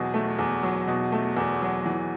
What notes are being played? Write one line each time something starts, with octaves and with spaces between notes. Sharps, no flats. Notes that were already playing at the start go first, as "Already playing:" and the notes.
Already playing: E2 B2 F#3
A3
E2
F#3
B2
A3
E2
F#3
E3